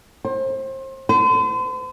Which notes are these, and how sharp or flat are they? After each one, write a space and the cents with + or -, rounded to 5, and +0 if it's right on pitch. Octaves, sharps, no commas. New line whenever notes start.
C5 +30
C5 -45